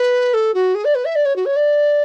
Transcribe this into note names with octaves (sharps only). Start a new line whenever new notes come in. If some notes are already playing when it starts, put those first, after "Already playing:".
Already playing: B4
A4
F#4
G#4
D5
B4
E5
D5
C#5
F#4
C#5
D5